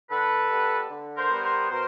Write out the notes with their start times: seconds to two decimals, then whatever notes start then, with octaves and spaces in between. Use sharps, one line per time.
0.10 D3 A4 B4
0.50 G3 B3
0.90 D3
1.17 A#4 C5
1.30 G3 B3
1.43 A#4 C5
1.70 B2 A#4 C5